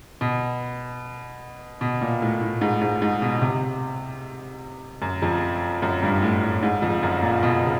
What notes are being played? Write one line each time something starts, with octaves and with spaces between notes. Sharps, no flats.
B2
B2
A#2
A2
A2
G#2
G#2
G#2
B2
C3
F#2
F2
F#2
G2
A2
A2
G#2
F2
F#2
A#2
B2
C#3